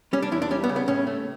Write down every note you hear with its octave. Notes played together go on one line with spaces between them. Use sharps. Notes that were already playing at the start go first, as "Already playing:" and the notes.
G3 C#4
D4
E2 E4
D4
G3 C#4
B3
C#3
B3
A2 C#4
A3